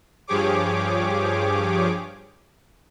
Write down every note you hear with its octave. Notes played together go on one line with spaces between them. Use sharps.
G2 F3 G4 G#4 C#5 D6